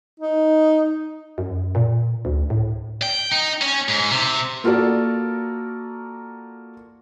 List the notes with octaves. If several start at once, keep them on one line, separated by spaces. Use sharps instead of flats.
D#4
F#2
A#2
D2
A2
G5
D#4
C#4
G#2
C3
A#3 F4 F#4 A4 A#4 D5